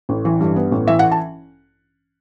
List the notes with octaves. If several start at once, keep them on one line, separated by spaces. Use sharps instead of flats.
A1
E3
G2
B3
A1
E3 E5
F#5
A5